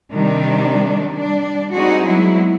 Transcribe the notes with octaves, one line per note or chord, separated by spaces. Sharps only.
C3 D#3 G3 D4
G3 D4
G3 C4 D#4 F#4 G#4
F#3 G#3 B3 E4